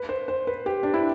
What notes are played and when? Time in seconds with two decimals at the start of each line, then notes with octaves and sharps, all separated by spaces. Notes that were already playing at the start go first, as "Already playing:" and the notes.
Already playing: B4
0.09 C5
0.28 C5
0.47 B4
0.66 G4
0.83 D4
0.94 E4